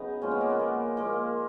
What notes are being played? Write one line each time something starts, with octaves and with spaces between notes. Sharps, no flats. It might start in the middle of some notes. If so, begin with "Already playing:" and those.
Already playing: C#3 F#3 B3 D#4
A#2 F3 G#3 A#3 C#4
B3
A#3
B3
A#3
A#2 F3 G#3 A#3